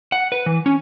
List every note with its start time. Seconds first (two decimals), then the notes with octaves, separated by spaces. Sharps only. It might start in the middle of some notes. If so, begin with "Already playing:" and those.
0.12 F#5
0.32 B4
0.46 E3
0.66 C#4